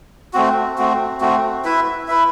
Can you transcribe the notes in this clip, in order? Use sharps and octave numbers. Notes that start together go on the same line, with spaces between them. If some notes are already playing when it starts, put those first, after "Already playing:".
A3 C4 F#4
A3 C4 F#4
A3 C4 F#4
E4 B4 E5
E4 B4 E5